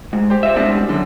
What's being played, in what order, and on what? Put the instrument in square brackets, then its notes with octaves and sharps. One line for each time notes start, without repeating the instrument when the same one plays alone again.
[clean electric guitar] G#2
[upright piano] G4 C5
[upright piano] F4 [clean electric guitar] C5 E5
[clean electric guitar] C#2 B2 [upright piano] G3 C4 D4
[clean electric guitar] F#2 [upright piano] D3